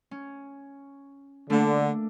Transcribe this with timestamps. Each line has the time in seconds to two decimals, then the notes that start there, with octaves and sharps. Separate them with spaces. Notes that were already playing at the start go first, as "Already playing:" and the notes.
0.11 C#4
1.50 D3 A3 A#3 D4